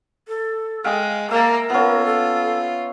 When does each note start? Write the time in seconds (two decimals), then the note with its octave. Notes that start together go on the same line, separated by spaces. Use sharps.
0.28 A4
0.84 G#3 F5 G5 D#6
1.31 A#3 A#4 E5 A5
1.70 B3 C#4 F4
2.06 A4